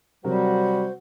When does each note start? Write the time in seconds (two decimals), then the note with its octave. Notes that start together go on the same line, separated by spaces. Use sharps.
0.24 C3 F#3 G3 F#4 A#4 C5